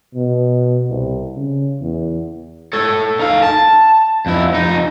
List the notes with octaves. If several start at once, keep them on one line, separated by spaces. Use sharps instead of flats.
B2
C2
C#3
E2
A4 C#5
D#4 F5
A5
F2 E4
F2 D#4